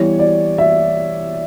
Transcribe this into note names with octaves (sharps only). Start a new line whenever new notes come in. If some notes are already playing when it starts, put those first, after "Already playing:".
Already playing: E3 G3 B3 E4 C#5
D5
E5